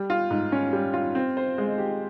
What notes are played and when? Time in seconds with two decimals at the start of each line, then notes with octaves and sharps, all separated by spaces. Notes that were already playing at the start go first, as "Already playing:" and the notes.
Already playing: G3
0.10 F4
0.30 G#2
0.52 C#4
0.73 G3
0.93 F4
1.15 C4
1.37 C5
1.58 G#3
1.78 G4